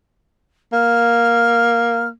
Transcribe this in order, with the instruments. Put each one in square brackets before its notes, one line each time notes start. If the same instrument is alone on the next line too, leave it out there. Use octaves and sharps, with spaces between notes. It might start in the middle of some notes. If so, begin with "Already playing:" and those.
[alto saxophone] A#3 [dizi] F6